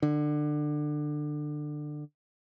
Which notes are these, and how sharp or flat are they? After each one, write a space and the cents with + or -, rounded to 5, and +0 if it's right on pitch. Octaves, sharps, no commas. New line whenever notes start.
D3 +25